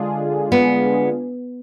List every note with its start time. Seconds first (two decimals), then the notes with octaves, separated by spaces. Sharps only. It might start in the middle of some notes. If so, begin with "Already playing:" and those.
Already playing: D3 G#3 D4 F4 G#4
0.52 B3